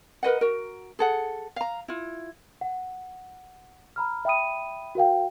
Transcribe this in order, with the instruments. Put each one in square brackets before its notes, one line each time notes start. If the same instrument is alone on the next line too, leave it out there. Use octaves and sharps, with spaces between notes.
[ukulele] A#4 B4 D#5 F#5
F#4 A#4
G#4 A4 F#5
F5 A#5
E4 F4
[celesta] F#5
A#5 B5 F6
E5 G5 B5 D#6 D#7
F#4 A#4 F5 G5